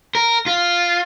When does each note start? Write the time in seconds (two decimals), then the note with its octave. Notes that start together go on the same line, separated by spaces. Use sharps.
0.15 A#4
0.46 F4